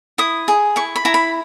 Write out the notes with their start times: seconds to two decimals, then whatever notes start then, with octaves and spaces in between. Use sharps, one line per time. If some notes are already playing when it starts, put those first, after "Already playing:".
0.18 E4 D#6
0.48 G#4
0.76 E4 C#6
0.96 B5
1.05 E4 A#5
1.14 B5